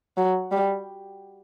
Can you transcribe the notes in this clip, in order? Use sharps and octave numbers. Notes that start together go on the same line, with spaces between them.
F#3
G3